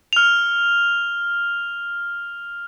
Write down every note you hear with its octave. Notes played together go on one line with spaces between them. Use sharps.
F6 F7